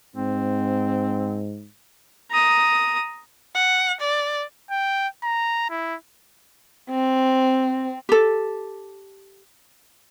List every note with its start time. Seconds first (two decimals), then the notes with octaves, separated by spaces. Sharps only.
0.16 G#2 C4
2.31 A#5 D#6
3.55 F#5
4.01 D5
4.71 G5
5.23 A#5
5.70 E4
6.90 C4
8.09 G4 A4